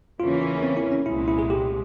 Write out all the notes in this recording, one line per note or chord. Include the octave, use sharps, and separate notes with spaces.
E2 C#3 E3 A#3 C#4 F4
E4
C4
E4
C#4
C2 A#2 G#3 E4
E4
G#4
G4